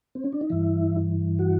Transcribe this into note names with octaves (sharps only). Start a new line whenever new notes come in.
C4
C#4
D4
D#4
G2 E3 E4
F#4